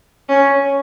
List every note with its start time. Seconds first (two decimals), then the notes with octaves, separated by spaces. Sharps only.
0.29 C#4